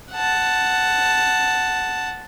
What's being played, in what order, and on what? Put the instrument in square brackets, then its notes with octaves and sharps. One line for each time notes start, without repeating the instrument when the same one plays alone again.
[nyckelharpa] F#5 A5